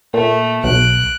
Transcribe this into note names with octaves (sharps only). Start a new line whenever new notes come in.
A#2 A3
B1 F#6 D7